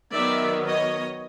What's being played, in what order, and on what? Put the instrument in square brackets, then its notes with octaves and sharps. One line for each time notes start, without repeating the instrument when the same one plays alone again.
[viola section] D#3 F#3 B3 D5 E5
C#5 D#5